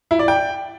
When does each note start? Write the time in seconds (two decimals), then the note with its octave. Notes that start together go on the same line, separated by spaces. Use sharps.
0.11 E4
0.19 D5
0.28 G5